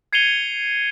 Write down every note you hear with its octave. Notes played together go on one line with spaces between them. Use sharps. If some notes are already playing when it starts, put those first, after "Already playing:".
G#6 C7 C#7 D#7 F7 G7